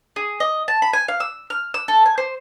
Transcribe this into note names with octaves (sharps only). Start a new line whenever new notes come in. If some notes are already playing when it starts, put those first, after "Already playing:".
G#4
D#5
A5
B5
G#5
F5
E6
F6
E6
A4
G#5
C5